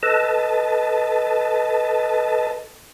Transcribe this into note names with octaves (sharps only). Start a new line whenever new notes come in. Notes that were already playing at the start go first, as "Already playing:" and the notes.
A4 B4 D#5 A5